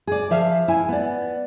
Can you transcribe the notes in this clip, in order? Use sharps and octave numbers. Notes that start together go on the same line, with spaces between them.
G#4 D5
F3 E5 F5 A5
E4 G#5
B3 D5